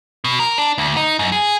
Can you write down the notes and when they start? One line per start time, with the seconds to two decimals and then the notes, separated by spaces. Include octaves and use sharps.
0.24 B2
0.39 A#4
0.58 D4
0.78 D2
0.97 D#4
1.19 F#2
1.32 G#4